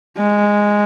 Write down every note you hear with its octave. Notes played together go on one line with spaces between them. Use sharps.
G#3